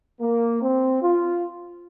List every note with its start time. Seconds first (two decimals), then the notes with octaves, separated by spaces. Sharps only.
0.21 A#3
0.61 C4
1.02 F4